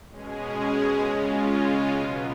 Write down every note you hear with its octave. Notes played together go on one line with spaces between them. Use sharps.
B2 G#3 C#4 G#4
C#3 G#3 C#4 F4
B2 F#3 B3